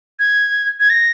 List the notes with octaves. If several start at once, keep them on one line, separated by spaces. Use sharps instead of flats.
G#6
G#6
A#6